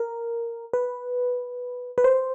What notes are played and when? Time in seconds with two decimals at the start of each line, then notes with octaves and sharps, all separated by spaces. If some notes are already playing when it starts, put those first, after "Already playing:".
Already playing: A#4
0.73 B4
1.98 B4
2.04 C5